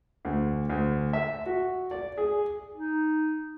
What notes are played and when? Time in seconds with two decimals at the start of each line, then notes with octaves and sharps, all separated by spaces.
0.25 D2
0.70 D2
1.13 E5
1.46 F#4
1.91 D5
2.18 G#4
2.75 D#4